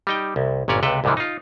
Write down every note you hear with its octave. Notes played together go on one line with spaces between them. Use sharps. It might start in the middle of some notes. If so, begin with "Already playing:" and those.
G3 D#4 G5
C2
G1 A#2 C#4 C#5 D5
C#2 C3 A4 B4 G5
C2 G#2 D3 E3 F3
D#4 F4